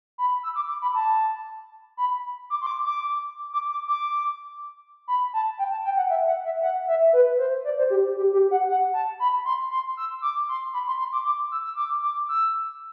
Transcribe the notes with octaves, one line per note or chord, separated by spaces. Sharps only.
B5
E6
D6
D6
B5
A5
B5
D6
C6
D6
D6
D6
D6
D6
B5
A5
G5
A5
G5
F#5
E5
F#5
E5
F#5
E5
B4
C5
D5
C5
G4
G4
G4
F#5
F#5
A5
B5
C6
C6
E6
D6
C6
B5
C6
C6
D6
D6
E6
E6
D6
D6
E6